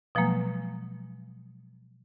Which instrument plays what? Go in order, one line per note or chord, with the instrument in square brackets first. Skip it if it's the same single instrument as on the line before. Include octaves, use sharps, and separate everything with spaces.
[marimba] B2 F3 F#3 G#3 A#3